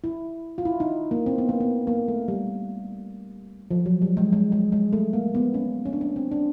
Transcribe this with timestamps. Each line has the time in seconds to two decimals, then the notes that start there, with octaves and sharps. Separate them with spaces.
0.04 E4
0.58 F4
0.65 E4
0.80 D#4
1.11 A#3
1.26 C4
1.38 B3
1.49 A#3
1.60 B3
1.87 A#3
2.08 A3
2.28 G3
3.71 F3
3.86 F#3
4.02 G3
4.17 G#3
4.32 G#3
4.52 G#3
4.72 G#3
4.93 A3
5.13 A#3
5.35 B3
5.54 C#4
5.85 C#4
5.93 D4
6.01 C#4
6.16 C4
6.31 D4